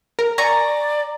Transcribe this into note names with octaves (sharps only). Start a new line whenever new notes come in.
A#4
D5 G#5 A#5 C#6